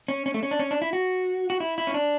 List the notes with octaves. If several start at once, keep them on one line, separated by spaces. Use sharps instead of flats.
C#4
C#4
A3
C#4
D4
C#4
D4
E4
F#4
F#4
E4
E4
C#4
D4